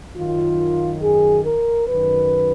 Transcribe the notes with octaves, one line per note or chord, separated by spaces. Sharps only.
F#2 D#3 F4
G#4
A#4
F#2 D#3 B4